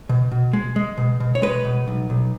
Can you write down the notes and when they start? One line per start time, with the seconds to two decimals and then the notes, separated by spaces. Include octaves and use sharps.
0.09 B2
0.32 B2
0.53 G#3
0.76 G#3
0.98 B2
1.20 B2
1.35 C#5
1.42 G#3 B4
1.65 B2
1.88 B1
2.10 B1